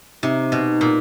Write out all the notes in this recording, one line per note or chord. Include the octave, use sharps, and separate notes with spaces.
C3 D#4
B2
A#2